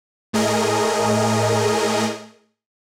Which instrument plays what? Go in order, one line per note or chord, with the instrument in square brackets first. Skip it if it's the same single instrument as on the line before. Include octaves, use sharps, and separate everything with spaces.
[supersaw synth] A2 A3 G#4 A#4 D#5